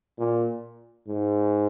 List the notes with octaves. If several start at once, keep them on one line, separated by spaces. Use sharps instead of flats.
A#2
G#2